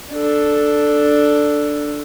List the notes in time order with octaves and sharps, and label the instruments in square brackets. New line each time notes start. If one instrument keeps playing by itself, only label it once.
[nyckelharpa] D4 A4